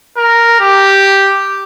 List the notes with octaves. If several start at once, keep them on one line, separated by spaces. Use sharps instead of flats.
A#4
G4